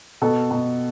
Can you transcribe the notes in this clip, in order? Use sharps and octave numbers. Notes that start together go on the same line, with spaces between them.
B2 A4
B2